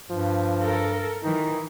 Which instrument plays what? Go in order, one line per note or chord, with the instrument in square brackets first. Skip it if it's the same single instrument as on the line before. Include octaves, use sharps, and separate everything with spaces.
[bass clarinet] G2 [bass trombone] F3
[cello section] A4 A#4
[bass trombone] D#3 [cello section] E3 [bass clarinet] D#4